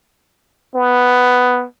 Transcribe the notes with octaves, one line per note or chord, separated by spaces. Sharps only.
B3